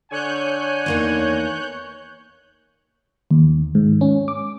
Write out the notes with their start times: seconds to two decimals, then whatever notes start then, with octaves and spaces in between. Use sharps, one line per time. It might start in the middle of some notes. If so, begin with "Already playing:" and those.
0.11 D3 C#5 G#5 F#6 G6
0.86 E2 A#3 D#4
3.31 D#2
3.75 G#2
4.01 C#4
4.28 D6